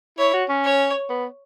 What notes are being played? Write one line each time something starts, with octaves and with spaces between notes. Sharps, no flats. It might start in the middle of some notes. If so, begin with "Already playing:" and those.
E4 C#5
F#4
C#4
C#5
B3